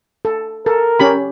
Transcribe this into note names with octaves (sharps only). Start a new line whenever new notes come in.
A4
A4 A#4
C#4 G4 B5